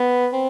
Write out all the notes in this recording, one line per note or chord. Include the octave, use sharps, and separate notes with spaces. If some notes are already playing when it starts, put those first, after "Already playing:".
Already playing: B3
C4